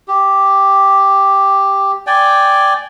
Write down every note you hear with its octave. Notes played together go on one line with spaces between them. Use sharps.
G4
D5 G5 G#5